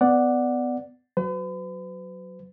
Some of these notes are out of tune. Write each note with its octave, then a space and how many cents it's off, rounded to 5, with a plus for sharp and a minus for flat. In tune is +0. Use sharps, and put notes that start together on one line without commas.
B3 +25 D5 +0 F#5 +0
F#3 +0 B4 +40